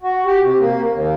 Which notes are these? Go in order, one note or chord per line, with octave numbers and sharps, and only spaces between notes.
F#4
G4
C3
A#3
D#2